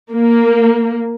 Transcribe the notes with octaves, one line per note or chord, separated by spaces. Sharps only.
A#3